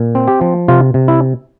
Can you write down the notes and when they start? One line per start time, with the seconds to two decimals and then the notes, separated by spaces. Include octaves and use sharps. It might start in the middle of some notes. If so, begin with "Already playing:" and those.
Already playing: A#2
0.15 C4
0.28 G4
0.41 F3
0.68 C3 F4
0.94 C3
1.08 E4